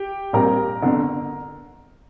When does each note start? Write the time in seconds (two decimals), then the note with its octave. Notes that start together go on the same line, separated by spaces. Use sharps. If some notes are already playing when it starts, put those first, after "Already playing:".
Already playing: G4 G5
0.33 A#1 A#2 G3 C4 A#4 A#5
0.82 G1 F2 D3